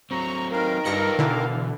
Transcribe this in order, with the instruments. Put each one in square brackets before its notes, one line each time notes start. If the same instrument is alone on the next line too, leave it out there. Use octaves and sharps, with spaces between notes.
[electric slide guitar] F#3 C4 [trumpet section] A#5 C#6
[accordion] D#3 A#4 [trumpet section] G#3 B4 F5
[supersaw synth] G2 A#6 C#7 [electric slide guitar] F4 B4 [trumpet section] A4 D5 F5
[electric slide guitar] B2 [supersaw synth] D3 E3